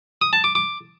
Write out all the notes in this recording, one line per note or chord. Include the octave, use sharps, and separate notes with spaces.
D#6
A5
D6
D6